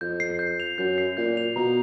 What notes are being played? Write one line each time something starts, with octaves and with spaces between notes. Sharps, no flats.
F2 G6
C7
G6
F7
F#2 G6
C7
A#2 G6
F7
B2 A#5